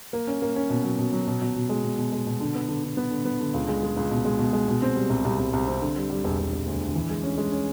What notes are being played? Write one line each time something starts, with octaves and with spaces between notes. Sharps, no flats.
A#3
C#4
A#3
C#4
B2
F#3
B2
F#3
B2
B2
B2
G#3
B2
B2
G#3
B2
D3
B3
D3
D3
B3
D3
B3
D3
C#2
G#3
G#3
C#2
B2
G#3
B2
G#3
B2
C4
G3
C2
C2
C2
C2
C4
D3
G3
G3
E1
E1
E1
D2
D3
E3
G#3
C#4
G#3
C#4